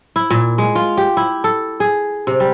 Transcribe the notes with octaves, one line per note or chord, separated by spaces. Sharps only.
E4
A#2
G#3
F4
G4
E4
A4
G#4
C3
G3